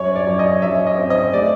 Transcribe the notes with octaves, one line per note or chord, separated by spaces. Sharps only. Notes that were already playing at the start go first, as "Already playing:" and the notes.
Already playing: F#2 C#5
D5
F#2
D#5
F#2 E5
D#5
C4
D#5
A3 D5